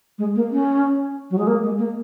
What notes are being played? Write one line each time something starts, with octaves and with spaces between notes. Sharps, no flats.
G#3
A#3
C#4
F#3
G#3
A#3
G#3
A#3